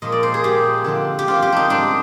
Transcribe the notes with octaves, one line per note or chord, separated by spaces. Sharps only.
A#2 F3 G#3 D#5
D5
C5
G#4
A#2 F3 G#3 G4
D3 F3 C4
G4
D3 F3 C4 F4
G4
D4 D#4
G#2 G3 C4 D4